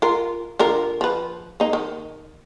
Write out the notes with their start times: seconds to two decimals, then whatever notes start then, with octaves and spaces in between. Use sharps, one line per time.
0.02 F4 A#4
0.59 D3 F4 A#4
1.01 F3 B4
1.60 A#3 D#4
1.73 D#3